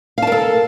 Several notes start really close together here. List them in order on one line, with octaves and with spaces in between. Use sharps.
F5 A5 A#4 A4